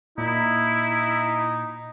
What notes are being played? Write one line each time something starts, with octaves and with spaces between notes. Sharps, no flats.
A#2 D#4 E4